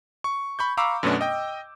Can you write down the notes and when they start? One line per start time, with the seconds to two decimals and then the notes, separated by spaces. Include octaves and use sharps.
0.24 C#6
0.59 B5 C#6 G6
0.77 F5 A#5 B5 C#6 D6 E6
1.03 F#2 B2 A3 B3 C#4 D4
1.21 D#5 G5